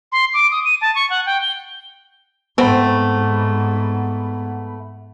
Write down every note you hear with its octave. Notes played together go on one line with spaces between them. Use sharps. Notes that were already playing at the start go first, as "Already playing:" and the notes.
C6
D6
D#6
D#7
A5
C#6
F#5
G5
G7
G#2 A3 B3 C4 F#5 B5